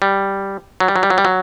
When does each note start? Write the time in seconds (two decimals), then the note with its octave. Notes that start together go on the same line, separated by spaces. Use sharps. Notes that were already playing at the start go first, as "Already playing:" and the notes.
0.02 G3
0.80 F#3
0.88 G3
0.96 F#3
1.03 G3
1.10 F#3
1.18 G3
1.25 F#3